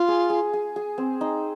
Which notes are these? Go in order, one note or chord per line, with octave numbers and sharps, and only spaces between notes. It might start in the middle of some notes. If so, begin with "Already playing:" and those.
Already playing: F4
G#4
G#4
G#4
G#4
C4
D#4